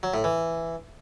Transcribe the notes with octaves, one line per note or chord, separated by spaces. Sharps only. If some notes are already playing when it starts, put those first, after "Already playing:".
F#3
A2
E3